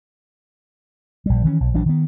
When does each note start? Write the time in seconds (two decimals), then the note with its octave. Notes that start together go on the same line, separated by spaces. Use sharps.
1.26 A#1 G3
1.44 D#3 E3 A#3 C#4
1.60 B1
1.74 A#1 E3 F#3 D4
1.86 D#3 B3